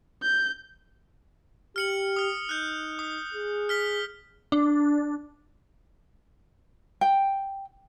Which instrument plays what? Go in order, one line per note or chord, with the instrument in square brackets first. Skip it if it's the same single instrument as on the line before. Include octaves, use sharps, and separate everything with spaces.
[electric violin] G6
[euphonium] G4 [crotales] F6 C#7 F#7
[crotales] D#6 F6
[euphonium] D#4 [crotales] F#6 G6
[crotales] D#6
[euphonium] G#4
[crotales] F6 B6 G7
[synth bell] D4
[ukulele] G5